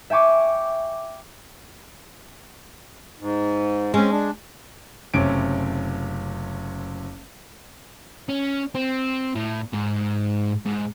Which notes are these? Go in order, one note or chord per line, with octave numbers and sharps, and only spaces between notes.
E5 G5 G#5 C#6 D6
G#2
G#3 C4 C#4
D4
F#1 C3 A3 C#4 D7
C#4
C4
A2
G#2
G#2